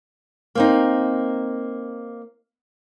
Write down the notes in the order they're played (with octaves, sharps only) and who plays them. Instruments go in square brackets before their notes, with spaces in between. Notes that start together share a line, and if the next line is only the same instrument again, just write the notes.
[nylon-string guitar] A#3 C4 D#4